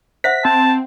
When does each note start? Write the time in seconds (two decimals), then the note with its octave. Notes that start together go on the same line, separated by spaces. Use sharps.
0.24 C5 E5 F#5 B6
0.45 C4 A5